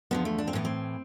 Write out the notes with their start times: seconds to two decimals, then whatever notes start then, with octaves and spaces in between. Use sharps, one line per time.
0.11 E2 D3 F3 B3
0.25 A3
0.38 D4
0.47 C4
0.53 A2 E3 B3
0.65 C4